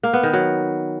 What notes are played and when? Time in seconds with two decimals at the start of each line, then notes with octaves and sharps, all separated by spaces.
0.03 A#3
0.13 B3
0.23 D#3
0.33 F#3